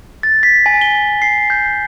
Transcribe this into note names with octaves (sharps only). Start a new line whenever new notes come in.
A6
B6
G#5
G7
C7
G6